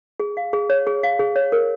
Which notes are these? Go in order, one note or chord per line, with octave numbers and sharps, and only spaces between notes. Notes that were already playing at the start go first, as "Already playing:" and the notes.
G#4
F5
G#4
C#5
G#4
F5
G#4
C#5
A#4